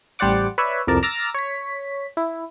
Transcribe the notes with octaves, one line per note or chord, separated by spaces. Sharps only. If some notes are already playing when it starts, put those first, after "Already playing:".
A1 G3 C5 D5 F#5 D6
B4 C#5 D5 E5
C2 F2 A#4 D5 A5
A#5 D6 E6 F6 A6 A#6
C#5 B6
E4